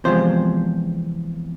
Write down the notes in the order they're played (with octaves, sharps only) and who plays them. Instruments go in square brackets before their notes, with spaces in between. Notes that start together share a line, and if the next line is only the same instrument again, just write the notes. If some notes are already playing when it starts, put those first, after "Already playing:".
[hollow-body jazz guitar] E2 C3 F3 G#3 C5